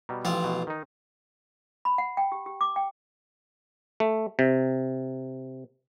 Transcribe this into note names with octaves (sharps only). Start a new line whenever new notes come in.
B2 G3 A#5
A1 F3 C4 F4
B2
D#3 D#4
B5
F#5
G5
G4
G4
D6
G5
A3
C3